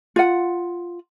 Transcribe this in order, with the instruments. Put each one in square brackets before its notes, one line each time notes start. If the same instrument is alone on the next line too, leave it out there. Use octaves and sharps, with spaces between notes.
[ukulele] F4 F#5